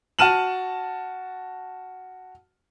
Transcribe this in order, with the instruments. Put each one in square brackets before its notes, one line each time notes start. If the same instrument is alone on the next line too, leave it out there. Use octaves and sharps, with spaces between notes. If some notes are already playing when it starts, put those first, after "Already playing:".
[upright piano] F#4 A5 F6 D#7 E7 F#7